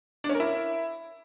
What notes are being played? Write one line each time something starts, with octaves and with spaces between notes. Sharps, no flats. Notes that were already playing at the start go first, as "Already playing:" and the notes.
D4
C#4
A#4
E4